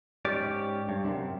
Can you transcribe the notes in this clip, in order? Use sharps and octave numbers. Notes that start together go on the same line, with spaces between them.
G#2 C#4 G4 D5
G2
F#2 A2 C3